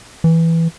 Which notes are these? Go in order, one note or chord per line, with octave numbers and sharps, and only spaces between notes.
E3